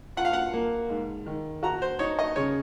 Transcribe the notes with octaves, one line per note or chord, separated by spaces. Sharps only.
F4 F#5
F5
F#5
A#3
G#2
D#3
F#4 A#5
C5
D#4 C#5
D#5
C#3 C#5